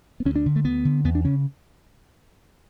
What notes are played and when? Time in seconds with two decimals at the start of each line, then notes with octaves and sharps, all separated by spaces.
0.20 B3
0.25 D2 C#4
0.36 D4
0.46 D3
0.56 A3
0.65 D2 B3
0.85 D3
1.04 E2 B3
1.15 D4
1.25 C#3 C#4